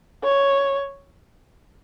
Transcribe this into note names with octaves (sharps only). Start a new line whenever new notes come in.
C#5